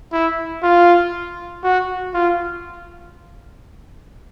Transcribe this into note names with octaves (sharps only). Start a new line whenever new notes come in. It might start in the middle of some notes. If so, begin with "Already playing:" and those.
E4
F4
F#4
F4